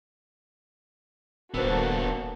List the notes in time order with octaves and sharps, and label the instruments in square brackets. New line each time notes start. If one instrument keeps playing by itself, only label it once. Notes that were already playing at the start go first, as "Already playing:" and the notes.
[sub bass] D#1 [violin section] A#3 F#4 A4 [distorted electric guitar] B3 D4 [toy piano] A#4 C5